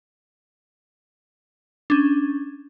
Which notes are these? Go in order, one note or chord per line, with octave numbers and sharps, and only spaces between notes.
C#4 D4